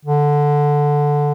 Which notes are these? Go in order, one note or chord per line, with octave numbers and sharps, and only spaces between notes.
D3